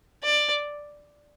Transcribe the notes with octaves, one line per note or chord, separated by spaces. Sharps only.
D5